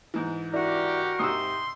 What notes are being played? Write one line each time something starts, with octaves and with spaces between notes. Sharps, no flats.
G#2 E3
D4 E4 F#4 G4 A#4 D5
G#2 C3 C6 D#6 E6